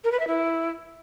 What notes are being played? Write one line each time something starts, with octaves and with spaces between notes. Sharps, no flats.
A#4
B4
E5
E4